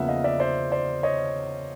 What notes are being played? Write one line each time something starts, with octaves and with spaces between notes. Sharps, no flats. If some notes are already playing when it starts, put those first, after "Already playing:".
Already playing: E2 C#3 F3 A#3 E5 F#5
D#5 F5
D5 E5
C5 D5
C5 D5
C#5 D#5